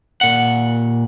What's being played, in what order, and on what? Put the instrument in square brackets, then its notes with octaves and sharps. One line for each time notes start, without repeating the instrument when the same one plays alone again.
[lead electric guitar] A#2 F#5